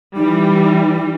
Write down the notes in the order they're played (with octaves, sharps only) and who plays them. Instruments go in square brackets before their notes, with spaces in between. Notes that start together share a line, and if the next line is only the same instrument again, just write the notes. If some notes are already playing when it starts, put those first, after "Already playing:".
[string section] E3 G3 [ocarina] D#4